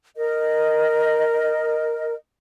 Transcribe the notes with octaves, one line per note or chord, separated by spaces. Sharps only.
A#4 D#5